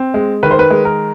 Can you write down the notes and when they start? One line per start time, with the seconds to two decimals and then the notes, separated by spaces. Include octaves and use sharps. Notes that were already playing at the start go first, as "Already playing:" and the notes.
Already playing: C4
0.14 G#3
0.43 D#3 B4
0.51 C5
0.59 B4
0.70 G#3
0.85 A#4